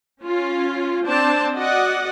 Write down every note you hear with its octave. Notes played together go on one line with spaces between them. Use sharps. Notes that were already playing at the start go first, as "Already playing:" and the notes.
C#4 F4
C4 D4 C5 D5 A5
F#4 D5 D#5 F#5